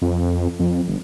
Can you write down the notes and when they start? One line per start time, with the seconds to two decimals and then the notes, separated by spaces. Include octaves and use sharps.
0.02 F2
0.60 F2
0.88 G1